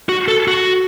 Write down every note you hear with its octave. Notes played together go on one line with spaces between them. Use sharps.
F#4
A4
F#4